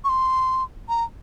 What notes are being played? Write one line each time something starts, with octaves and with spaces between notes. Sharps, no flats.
C#6
C6
A#5